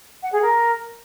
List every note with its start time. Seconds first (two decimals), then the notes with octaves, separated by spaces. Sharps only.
0.23 F#5
0.33 G#4
0.42 A#4